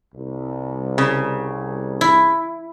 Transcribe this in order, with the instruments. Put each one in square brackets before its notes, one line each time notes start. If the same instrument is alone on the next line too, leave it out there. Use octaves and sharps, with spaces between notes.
[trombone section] C2
[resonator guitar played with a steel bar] C#3
[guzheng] E4